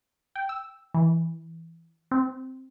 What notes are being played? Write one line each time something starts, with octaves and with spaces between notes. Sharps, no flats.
G5
E6
E3
C4